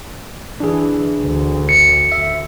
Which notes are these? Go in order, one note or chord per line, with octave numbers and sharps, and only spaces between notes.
E3 D4 G#4
D2
C#7
E5